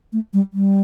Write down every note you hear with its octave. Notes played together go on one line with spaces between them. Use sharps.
A3
G3
G3